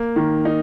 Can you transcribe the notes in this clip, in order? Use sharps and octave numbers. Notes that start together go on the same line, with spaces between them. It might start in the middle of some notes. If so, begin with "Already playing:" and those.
Already playing: A#3
D#3
D#4